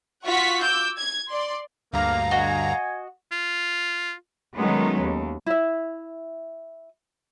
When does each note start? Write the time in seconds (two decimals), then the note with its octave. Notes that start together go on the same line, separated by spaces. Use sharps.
0.25 F4 F#4 F#5 C#6 B6
0.61 D6 E6 G6
0.97 G#6
1.29 D5 C6
1.93 D2 G2 A#3 F5 A#5
2.31 F#4 D#5 G#5
3.32 F4
4.55 D#3 F#3 G#3 A3 B3 C#4
5.01 D#2
5.46 E4 E5